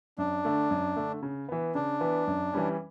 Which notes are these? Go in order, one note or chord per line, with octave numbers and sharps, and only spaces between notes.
F#2 D4
D3 A3
F#2
D3 A3
C#3
E3 B3
C#3 D4
E3 B3
F#2
E3 G3 C#4